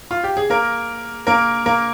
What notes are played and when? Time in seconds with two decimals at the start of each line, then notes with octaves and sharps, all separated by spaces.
0.11 F4
0.24 G4
0.37 G#4
0.50 A#3 A#4
1.27 A#3 A#4
1.66 A#3 A#4